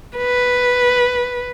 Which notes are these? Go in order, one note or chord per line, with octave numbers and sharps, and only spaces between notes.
B4